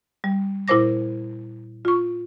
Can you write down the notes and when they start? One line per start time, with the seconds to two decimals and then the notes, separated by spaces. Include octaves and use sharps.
0.24 G3
0.68 A#2 E4 A#4 C5 D6 A#6
1.85 F4 C#6